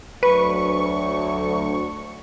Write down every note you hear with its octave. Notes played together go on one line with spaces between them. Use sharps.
D2 F#3 B4 C#6